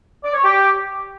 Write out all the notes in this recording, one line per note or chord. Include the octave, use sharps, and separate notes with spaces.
D5
C#5
G4